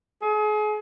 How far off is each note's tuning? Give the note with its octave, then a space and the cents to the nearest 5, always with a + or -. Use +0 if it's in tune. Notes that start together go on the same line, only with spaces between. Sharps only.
G#4 +35